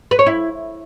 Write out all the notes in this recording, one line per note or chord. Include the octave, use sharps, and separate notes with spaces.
B4
C#5
E4